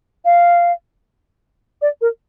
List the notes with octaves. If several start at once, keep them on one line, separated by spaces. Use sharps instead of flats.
F5
D5
A#4